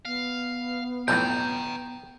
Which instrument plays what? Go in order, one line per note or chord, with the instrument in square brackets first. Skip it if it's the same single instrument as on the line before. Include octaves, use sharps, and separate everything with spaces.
[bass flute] B3 [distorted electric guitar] F5
[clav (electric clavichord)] B1 F2 A2 [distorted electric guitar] G5 A#5 [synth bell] G6